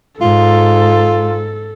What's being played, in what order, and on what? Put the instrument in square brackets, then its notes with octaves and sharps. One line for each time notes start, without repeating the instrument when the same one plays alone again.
[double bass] G#2 [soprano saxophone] F4 [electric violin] A4